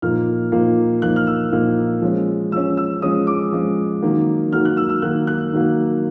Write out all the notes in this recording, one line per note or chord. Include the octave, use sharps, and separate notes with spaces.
A#2 F3 A#3 D#4 F6
A#2 F3 A#3 D#4
A#2 F3 A#3 D#4 F#6
F6
E6
A#2 F3 A#3 D#4
F3 G#3 C#4
F3 G#3 C#4 E6
E6
F3 G#3 C#4 D#6
D6
F3 G#3 C#4
D#3 F#3 A#3
D#3 F#3 A#3 F6
F#6
E6
E6
D#3 F#3 A#3 F#6
F#6
D#3 F#3 A#3